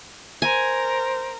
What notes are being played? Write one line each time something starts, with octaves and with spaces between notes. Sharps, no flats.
A#4 C5 G#5